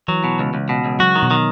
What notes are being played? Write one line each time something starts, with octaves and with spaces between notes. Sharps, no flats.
E3 F#3
B2
C#2
C#2
B2
C#2
F#3 F#4
D#3
B2
D#3